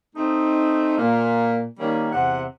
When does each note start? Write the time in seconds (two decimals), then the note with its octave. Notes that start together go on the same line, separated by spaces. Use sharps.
0.15 A3 C4 D#4
0.97 A#2 A#3
1.79 D#3 G3 A#3 C#4
2.12 E2 C3 F#5